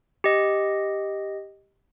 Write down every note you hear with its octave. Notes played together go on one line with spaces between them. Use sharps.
G4 D#5